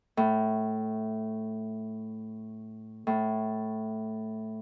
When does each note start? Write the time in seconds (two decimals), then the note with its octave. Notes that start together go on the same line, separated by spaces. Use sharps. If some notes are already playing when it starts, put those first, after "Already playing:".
0.17 A2
3.07 A2